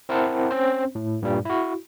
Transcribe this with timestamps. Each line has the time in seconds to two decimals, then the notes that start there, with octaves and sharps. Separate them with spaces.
0.09 C4 E4 A#4 C5 F#5 A5
0.51 C4 C#4 C5
0.95 A2
1.22 G2 A#2 G3
1.45 E4 F#4